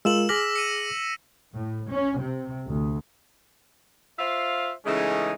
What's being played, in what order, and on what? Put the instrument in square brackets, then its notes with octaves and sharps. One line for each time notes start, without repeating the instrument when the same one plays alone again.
[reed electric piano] G#3 F4 A#4 [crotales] E6 E7 F#7
[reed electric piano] G#4 D6 F6 [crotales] A#6 B6 F#7
[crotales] C#7 D#7
[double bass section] A2
C#4
C3
D2
[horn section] F4 C5 E5 F5
C#3 E3 G#3 A3 C#4 D#4